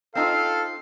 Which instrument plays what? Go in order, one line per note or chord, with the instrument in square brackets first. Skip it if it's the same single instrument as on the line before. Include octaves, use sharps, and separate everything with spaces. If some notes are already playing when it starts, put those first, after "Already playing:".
[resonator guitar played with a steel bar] C4 D#4 F4 [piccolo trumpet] A4 [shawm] F5